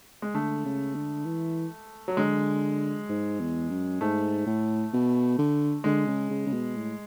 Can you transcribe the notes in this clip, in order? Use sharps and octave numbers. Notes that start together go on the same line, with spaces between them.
G#3
D3 A3
C#3
D3
E3
F#3
D3 G#3
G#2
E2
F#2
G#2 A3
A2
B2
D3
D3 G#3
C#3
C#3
C#3
B2
A2